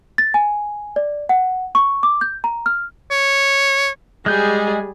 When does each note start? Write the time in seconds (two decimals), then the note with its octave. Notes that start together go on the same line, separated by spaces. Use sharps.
0.18 A6
0.34 G#5
0.96 D5
1.29 F#5
1.75 C#6
2.03 D6
2.21 G6
2.44 A#5
2.66 F6
3.11 C#5
4.26 G3 G#3 G#4 G6